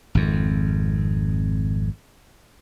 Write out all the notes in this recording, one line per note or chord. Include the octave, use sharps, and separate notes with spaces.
G#1 F2